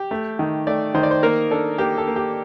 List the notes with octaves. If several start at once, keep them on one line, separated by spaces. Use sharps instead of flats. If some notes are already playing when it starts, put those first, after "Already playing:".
Already playing: G4
A3
D#3
A3 D5
D#3 C5
D5
C5
A#3 A#4
D4 A4
A#3 G4
A4
A#3
G4